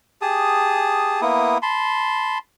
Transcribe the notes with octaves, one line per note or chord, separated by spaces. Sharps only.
G4 G#4 A5 D#6
A#3 B3 E4 D#6
A5 B5 C6